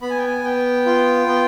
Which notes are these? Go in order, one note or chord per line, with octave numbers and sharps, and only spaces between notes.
B3 B5
G#5
G5
G#5
B3 G5
F4
B3